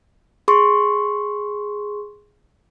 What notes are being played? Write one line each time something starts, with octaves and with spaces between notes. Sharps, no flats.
G#4 C6 C#6